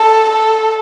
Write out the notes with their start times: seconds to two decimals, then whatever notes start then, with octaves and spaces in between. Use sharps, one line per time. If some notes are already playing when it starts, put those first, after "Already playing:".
Already playing: A4
0.30 A4